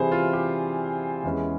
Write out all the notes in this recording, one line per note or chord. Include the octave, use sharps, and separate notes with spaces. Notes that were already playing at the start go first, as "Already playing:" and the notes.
Already playing: C3 E3 G3 G#4 C5
F4
G4
E2 E3 G#3 C#4